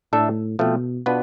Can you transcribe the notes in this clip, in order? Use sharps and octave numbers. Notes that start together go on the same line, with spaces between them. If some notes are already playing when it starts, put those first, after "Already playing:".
A2 A3 D4 A4 E5
B2 F3 A3 C4
B2 B3 D4 F4 B4